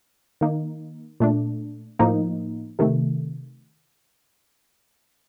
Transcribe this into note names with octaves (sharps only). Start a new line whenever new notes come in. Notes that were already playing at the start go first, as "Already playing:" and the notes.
D#3 A#3 D#4
A#2 A3 D4
A2 F3 A#3 D#4
C3 D#3 A3